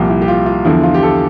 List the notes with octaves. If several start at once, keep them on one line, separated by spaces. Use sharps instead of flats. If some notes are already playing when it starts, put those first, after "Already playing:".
Already playing: C2 A#2 F3 G4
E4
G4
F4
F4
E2 D3 F3 E4
F4
G4
A4